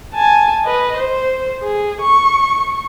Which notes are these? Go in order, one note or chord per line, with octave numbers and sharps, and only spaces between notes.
G#5 A5
B4 D#5
C5
G#4
C#6